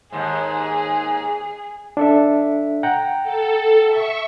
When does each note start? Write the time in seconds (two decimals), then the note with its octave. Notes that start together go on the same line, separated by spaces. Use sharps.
0.12 D#2 G#2 G#4
1.97 D4 A4 E5
2.83 F#5 G5 A#5
3.23 A4
3.86 E5 C#6